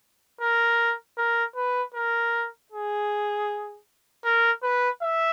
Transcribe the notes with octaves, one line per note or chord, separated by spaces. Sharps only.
A#4
A#4
B4
A#4
G#4
A#4
B4
E5